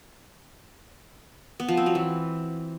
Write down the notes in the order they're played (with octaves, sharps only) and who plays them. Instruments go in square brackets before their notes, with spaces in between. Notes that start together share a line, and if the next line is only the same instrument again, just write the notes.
[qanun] B3
F3
C4
F#3
E3